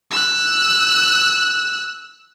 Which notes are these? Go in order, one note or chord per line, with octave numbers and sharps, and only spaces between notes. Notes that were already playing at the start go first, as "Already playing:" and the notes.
E6 F#6